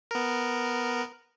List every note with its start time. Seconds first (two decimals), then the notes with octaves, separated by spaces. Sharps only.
0.11 B3 A#4